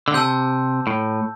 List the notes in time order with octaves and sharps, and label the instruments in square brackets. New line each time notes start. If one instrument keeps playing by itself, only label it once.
[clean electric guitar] D3
[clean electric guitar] C3 [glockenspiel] A5 E6 G6
[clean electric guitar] A2